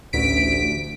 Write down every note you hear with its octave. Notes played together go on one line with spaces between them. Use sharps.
A1 D2 B6 D7